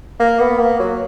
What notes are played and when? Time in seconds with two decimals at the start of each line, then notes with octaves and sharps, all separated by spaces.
0.20 A#3
0.40 B3
0.59 A#3
0.80 F#3